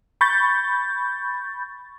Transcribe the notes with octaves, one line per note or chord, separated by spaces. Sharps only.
B5 C#6 G6 A6